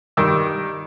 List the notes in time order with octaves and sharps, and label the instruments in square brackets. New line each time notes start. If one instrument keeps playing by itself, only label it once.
[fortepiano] G2 D#3 D6 E6